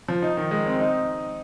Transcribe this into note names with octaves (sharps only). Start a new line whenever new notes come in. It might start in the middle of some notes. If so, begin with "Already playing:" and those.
F3
D#4
D#3
G#3
C4
D#4